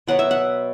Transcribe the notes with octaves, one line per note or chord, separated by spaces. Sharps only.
B2 F#3 B3 F#5
E5
F#5